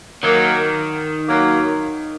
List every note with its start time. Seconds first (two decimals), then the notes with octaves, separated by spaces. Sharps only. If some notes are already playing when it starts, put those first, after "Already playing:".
0.24 D#3 F#3 A#3
1.29 F#3 A#3